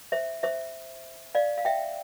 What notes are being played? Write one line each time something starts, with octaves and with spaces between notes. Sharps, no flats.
C5 E5
C5 E5
D5 F5
F5
E5 G5